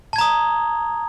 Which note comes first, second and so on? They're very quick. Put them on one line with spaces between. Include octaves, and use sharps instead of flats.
A5 G#6 A#5 D#6